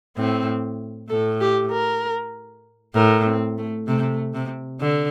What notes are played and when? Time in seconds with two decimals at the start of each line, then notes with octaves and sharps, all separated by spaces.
0.17 A2 C4
1.10 A2 A4
1.41 G4
1.72 A#4
2.95 A2 A#4
3.27 C4
3.58 A3
3.88 C3 A3
4.34 C3
4.80 D3